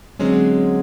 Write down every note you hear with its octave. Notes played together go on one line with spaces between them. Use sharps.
D3 F#3 G#3 C4 C#4